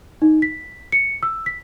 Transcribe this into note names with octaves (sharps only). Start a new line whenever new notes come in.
D#4
B6
C#7
E6
B6